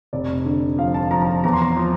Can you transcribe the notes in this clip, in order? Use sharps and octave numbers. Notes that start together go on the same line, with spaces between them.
F1 D5
D3
F3 F5
A5
F3 A#5
A#5
A5
E2 A#5
C6
A#5
F3